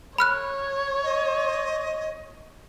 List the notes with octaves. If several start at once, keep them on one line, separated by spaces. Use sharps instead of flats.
C#5 B5 F6 F#6
D#5